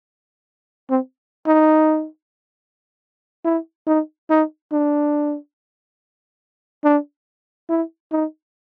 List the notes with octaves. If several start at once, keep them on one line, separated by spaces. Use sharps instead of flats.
C4
D#4
E4
D#4
D#4
D4
D4
E4
D#4